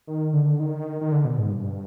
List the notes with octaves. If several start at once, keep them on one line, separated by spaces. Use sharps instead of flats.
D#3
D3
D#3
D#3
D3
B2
G#2
G2